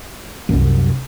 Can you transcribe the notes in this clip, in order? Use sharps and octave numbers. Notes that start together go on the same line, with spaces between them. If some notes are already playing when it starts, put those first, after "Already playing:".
C2 F#2